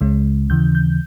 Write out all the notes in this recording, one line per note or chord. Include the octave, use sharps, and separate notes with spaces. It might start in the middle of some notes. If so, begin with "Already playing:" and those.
C#2 C#3 G#3 C#4
D#2 C#3 E3 G6
G6